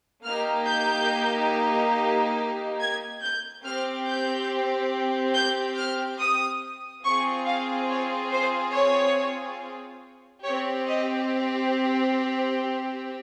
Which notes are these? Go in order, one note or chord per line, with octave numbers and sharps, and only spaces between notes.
A#3 D#4 G4 F6
G6
G#6
G6
C4 G4 F6
G6
G6
F6
D#6
C4 F4 G#4 C#6
F5
C#5
C5
C#5
C4 G4 C#5
D#5